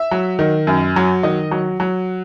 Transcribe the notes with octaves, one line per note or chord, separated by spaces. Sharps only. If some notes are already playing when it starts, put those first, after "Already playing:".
Already playing: E5
F#3
D#3
F#2
F#3
D#3 D#5
F#3
F#3